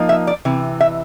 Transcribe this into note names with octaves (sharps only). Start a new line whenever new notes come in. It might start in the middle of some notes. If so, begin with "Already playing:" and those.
Already playing: F3 A#3 D#4
E5
D5
C3 E3
E5